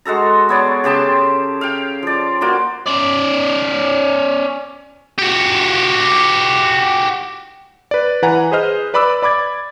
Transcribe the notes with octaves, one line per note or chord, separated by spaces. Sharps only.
G#3 F#4 A4 A#5
B3 C#5 D5
C#3 G4 A5 C6
F5 G5
F3 D5
A#3 F#4 D5 C6
C#4 D5
F#4 G4
B4 D5
E3 B4 F#5 G#5 A#5
G#4 B4 C5 D#5 F6
B4 D5 B5 D6 E6
D5 B5 D6 G#6 A6